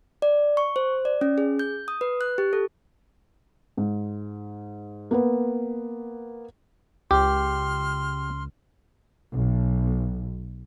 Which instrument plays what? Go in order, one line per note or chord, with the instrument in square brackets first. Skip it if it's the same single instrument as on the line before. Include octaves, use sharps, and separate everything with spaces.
[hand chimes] D5
C#6
C5
D5
C#4
G#4
G6
D#6
B4
F#6
G4
A4
[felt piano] G#2
A#3 B3 B4
[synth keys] C#2 [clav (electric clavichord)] G4 [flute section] C6 F6
[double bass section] B1